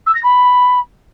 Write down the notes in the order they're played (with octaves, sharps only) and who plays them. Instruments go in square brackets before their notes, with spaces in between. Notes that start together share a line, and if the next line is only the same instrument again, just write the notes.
[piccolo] E6
A#6
B5